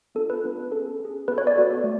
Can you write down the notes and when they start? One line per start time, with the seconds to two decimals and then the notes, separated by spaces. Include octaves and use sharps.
0.15 B3 D4 F4 A4
0.30 B4
0.44 B3 D4 F4
0.71 C#4 G#4 A4
1.00 C#4 G#4
1.28 B3 F#4 A4 B4
1.38 C#5
1.47 D5
1.56 B3 F#4 A4
1.84 A3